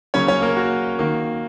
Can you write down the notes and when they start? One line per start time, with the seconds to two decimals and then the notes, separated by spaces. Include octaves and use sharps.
0.14 C#3 F#3 A#3 C#4 C#5
0.28 C#4 C#5
0.42 A#3 A#4
0.56 F#4
0.99 D#3 A#3